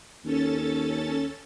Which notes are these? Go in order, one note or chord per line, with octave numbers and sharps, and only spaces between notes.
D#2 C#4 A4 A6